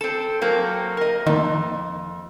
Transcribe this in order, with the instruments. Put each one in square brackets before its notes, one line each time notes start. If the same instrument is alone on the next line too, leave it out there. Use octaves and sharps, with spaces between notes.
[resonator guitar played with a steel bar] C4 A4 [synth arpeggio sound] E7
[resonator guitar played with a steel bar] F#3 A#3 C4
A#4 D#5
[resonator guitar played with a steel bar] F2 [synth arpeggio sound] D#3 A#3